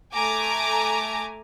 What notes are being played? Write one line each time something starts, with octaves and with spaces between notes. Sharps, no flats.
A3 G#5 A#5 D6